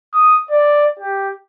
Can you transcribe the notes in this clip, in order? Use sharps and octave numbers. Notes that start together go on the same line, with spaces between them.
D#6
D5
G4